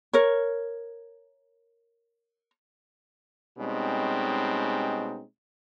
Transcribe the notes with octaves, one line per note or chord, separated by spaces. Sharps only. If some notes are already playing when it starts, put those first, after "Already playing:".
A#4 C#5
B2 G3 G#3 C4 C#4 D#4